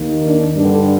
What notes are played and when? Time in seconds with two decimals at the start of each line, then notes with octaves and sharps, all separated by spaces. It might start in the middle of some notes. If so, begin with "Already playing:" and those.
Already playing: D#2 D#3 A#3
0.24 D4
0.57 G2 D3 G3 D4